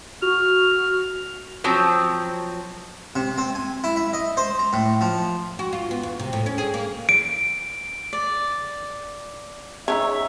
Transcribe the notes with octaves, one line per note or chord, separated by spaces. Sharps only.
F#4 F6
F3 F#3 C4
C3
C4
G#5
E4
E5
D#5
C5
A#5
A2
F3
F#4
F4
B3
E2
C3
A2
C#4
G#4
A#3
D7
D5
C#3 D4 D#4 C#5 E5